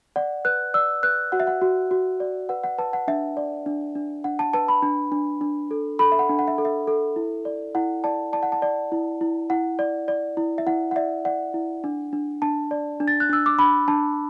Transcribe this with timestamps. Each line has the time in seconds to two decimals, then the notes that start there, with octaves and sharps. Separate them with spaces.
0.16 D5 F#5
0.45 B4 F#6
0.74 D5 E6
1.03 B4 F#6
1.32 F#4 F#5
1.40 E5
1.47 F#5
1.61 F#4
1.91 F#4
2.20 D5
2.49 B4 F#5
2.64 F#5
2.78 B4 A5
2.93 F#5
3.08 D4 E5
3.37 D5
3.66 D4
3.95 D4
4.24 D4 F#5
4.39 A5
4.53 B4 A5
4.68 B5
4.83 D4
5.12 D4
5.41 D4
5.71 A4
5.99 A4 B5
6.12 E5
6.19 F#5
6.29 D4
6.39 F#5
6.48 E5
6.58 A4
6.65 E5
6.87 A4
7.16 E4
7.45 D5
7.75 E4 F#5
8.04 D5 A5
8.33 D5 A5
8.43 F#5
8.52 A5
8.62 D5
8.92 E4
9.21 E4
9.50 E4 F#5
9.79 D5
10.08 D5
10.37 E4
10.58 E5
10.67 E4 F#5
10.91 F#5
10.96 D5 E5
11.25 D5 F#5
11.54 E4
11.84 D4
12.13 D4
12.42 D4 A5
12.71 D5
13.00 D4
13.08 A6
13.20 F#6
13.30 D4 E6
13.46 D6
13.59 D4 B5
13.88 D4 A5